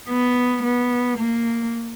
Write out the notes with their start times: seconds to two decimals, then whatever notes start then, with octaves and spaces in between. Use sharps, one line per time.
0.09 B3
0.63 B3
1.18 A#3